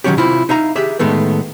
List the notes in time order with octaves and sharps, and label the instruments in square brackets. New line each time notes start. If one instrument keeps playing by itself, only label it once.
[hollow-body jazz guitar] D#3 F3 F#3 C#4 F#4 G4
C3 E4 F4 C5
D#4 E5 F5 A#5
G4 G#4 E5
A2 D#3 G#3 A3 B3